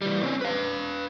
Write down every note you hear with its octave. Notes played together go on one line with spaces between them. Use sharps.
E3 G3
C4 C#4
B4 F5